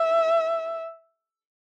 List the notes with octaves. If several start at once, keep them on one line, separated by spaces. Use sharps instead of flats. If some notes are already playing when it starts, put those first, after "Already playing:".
Already playing: E5